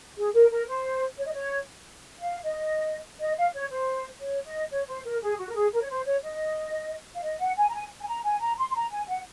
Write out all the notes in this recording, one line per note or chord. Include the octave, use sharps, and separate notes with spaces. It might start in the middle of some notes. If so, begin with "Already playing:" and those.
G#4
A#4
A#4
C5
C#5
D#5
C#5
F5
D#5
D#5
F5
C#5
C5
C#5
D#5
C#5
C5
A#4
G#4
F#4
A#4
G#4
A#4
C#5
C5
C#5
D#5
F5
D#5
F#5
G#5
A#5
G#5
G#5
A#5
G#5
A#5
C6
C6
A#5
G#5
F#5